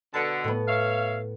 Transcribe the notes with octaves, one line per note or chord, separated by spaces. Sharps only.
B2 D3 A5 C#7
A2 B3
C#5 E5 F5